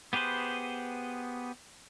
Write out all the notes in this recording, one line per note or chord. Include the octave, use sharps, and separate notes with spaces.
B3 G4 G#4 B4 C5